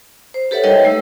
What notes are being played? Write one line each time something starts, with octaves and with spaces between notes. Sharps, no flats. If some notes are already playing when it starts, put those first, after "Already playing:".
C5
G4 A4 B4 C#5 E5 F#5
G3 D#4 A#4 C#5 D#5 G5
A3 E6